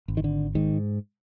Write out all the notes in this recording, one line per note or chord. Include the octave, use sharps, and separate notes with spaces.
G#1
D#3
D3
G#2 D#3